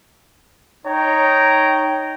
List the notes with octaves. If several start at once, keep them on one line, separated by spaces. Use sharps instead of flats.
D#4 C#5 G5 A#5